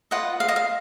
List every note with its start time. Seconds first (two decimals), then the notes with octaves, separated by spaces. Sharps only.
0.11 F4 B4 D#5 F#5
0.40 F5
0.48 D#5
0.56 F5